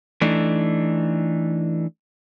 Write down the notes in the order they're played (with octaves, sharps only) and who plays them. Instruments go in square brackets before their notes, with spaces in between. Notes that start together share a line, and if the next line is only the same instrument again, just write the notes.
[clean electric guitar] E3 A3 D4 D#4